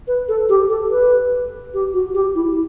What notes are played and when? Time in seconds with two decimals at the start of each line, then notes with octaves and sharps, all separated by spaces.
0.08 B4
0.28 A4
0.49 G4
0.70 A4
0.91 B4
1.74 G4
1.94 F#4
2.14 G4
2.35 E4